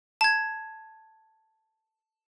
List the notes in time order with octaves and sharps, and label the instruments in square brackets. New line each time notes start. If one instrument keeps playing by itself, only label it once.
[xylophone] A5 G#6